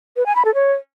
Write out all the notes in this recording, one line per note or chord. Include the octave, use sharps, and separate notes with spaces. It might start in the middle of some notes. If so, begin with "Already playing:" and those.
B4
G#5
B5
A4
C#5